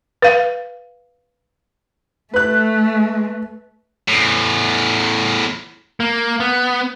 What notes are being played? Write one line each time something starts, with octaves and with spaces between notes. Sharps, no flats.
B4 F5
A3 B4 F#6
E2 A2
A#3
B3